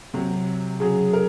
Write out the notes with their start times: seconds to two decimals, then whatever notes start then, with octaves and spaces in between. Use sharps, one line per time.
0.14 C3 F#3
0.80 C#3 F#3 G#4
1.13 A#4